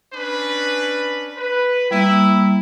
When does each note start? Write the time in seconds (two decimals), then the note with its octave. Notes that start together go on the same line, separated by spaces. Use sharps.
0.14 C#4 D4 B4
1.37 B4
1.91 G3 A#3 E4